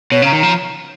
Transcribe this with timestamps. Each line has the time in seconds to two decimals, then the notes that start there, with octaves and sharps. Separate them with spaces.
0.12 B2 C#5
0.22 C#3 A#5
0.32 D#3
0.40 F3 A#5